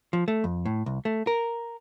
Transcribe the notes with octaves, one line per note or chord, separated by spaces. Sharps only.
F3
A3
F2
A2
C2
A3
A#4